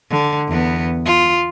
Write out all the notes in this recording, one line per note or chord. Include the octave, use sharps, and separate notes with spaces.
D3
E2 B3
F4